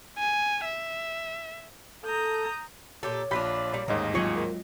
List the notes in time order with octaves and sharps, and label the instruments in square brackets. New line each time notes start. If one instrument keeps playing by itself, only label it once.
[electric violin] G#5
E5
[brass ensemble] A4 [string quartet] A#5 D#6 G6
[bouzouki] A#2 G4 A4 [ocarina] C#5
[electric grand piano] A#1 B5 B6 [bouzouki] D4 F4 G4
[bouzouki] A#2 G3 D5
[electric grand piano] A1 D#2 G#2 [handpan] G3 G#3 D#5 [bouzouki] A#3
[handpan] F#3 C4 F4 [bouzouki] G#4 C#5 D#5
[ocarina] A#4